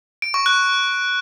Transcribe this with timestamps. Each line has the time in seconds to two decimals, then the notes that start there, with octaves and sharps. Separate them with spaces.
0.22 D7
0.34 C#6
0.46 F#6